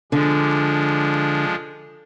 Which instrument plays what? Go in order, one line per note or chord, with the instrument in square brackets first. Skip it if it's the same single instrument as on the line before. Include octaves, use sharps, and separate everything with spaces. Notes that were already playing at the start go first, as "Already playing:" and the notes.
[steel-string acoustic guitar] D3 [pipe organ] F3 G#3 D4